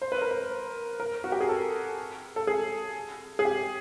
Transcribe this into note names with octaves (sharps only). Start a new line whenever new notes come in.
C5
B4
A#4
B4
A#4
F#4
G4
G#4
A4
A4
G#4
G#4
G4